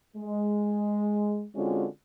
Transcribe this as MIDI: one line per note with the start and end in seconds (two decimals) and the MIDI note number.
0.17 1.47 56
1.55 1.86 50
1.55 1.86 56
1.55 1.86 60
1.55 1.86 61
1.55 1.86 65
1.55 1.86 66